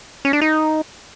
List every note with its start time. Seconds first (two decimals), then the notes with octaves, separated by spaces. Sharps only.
0.25 C#4
0.33 D4
0.41 D#4